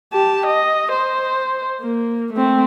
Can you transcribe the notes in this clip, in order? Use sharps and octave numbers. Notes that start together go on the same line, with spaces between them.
G4 A5
D#5
C5
A#3
A3 C4